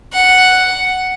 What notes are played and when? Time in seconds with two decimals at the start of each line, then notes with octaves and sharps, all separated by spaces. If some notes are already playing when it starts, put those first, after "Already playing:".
0.13 F#5